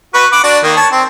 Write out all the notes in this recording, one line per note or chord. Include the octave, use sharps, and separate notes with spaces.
F#4 B4 C#6
F#5 B5 D6
D4 F#4 D5
D#3 A#3
C#5 A5
C4